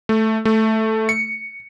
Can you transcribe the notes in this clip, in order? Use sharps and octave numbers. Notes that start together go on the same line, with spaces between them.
A3
A3
C#7